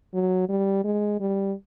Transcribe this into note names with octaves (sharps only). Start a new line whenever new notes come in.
F#3
G3
G#3
G3